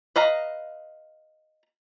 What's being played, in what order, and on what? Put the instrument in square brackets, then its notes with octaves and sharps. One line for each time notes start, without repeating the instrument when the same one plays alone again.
[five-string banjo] B4 D#5 F5 A#5